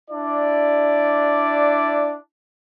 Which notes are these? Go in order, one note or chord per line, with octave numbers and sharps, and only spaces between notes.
D4 E4 D5